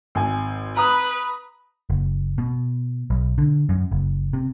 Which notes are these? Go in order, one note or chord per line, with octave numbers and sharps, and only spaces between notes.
G#1 G#5
B4 A#5 B5 D#6
F#1
B2
B1
D3
F#2
F#1
C3